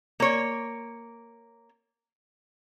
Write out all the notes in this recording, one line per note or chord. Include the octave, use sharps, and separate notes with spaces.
A#3 C#5